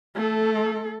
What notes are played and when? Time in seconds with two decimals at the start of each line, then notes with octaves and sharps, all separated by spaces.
0.15 A3 A4